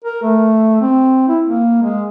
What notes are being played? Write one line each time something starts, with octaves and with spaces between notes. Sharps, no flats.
A#4
A3
C4
E4
A#3
G#3